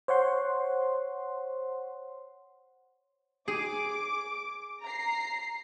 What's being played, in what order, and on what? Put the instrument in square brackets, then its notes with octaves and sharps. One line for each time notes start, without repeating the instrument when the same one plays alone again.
[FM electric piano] C5 C#5 F#5 C6
[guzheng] G#4 [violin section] D6 D7
[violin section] A#5 C7